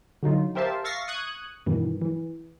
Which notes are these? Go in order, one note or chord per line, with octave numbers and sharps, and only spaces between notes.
D3 F#3 D#4 F4
G4 A#4 C5 E5 F5 A5
E5 F5 C#6 A6 A#6 C7
C#6 D#6 F#6 G#6
G2 B2 D#3 E3
E3